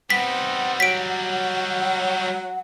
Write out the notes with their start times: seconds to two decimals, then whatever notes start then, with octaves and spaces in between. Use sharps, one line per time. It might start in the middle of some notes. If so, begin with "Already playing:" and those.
0.10 G3 B3 C4 D#4 F#5 B6
0.80 F#3 B6 D7